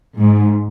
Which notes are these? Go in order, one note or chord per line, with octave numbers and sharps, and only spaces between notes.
G#2